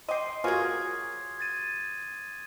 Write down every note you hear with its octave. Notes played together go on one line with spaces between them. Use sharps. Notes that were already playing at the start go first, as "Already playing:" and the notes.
D#5 G5 C6 D6 C7
F#3 F4 F#4 G#4 A#4 D#6 G#6
G#6 A6 D#7